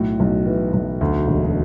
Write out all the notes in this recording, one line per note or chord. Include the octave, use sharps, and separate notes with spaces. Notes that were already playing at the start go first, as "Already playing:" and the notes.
Already playing: B1 A2 F#4
B1
E3
B1
D2
E1